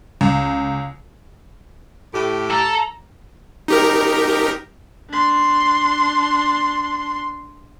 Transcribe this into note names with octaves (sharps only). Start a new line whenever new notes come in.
C#2
A2 G4
A4 A#5
D#4 G4 A#4
D4 C6